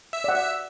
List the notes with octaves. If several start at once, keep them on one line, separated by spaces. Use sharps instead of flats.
E5 E6
D5 F#5
E5 E6